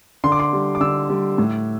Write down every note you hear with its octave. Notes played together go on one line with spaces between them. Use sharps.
D3 C6
D6
C6
G3
D6
D3 E6
G3
A2